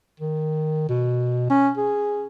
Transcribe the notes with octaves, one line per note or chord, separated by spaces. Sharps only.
D#3
B2
C#4
G#4